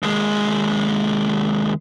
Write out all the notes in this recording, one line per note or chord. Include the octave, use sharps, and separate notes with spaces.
D#2 G#3